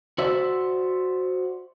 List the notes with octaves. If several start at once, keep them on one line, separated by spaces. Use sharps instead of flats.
F#4 C5 D5 E5